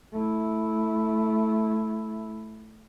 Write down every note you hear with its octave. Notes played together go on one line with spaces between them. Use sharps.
A3 E4